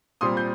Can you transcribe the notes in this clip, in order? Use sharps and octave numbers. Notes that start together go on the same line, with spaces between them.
A#2 G3 C4 C6 D#6
G6